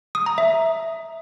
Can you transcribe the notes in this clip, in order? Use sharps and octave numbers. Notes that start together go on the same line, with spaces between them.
D#6
A#5
E5